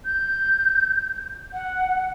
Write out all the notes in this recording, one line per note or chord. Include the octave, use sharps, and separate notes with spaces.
G6
F#5